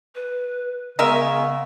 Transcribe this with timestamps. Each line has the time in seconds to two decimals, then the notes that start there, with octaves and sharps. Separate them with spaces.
0.15 B4
0.99 C#3 G#3 B3 A#4 E5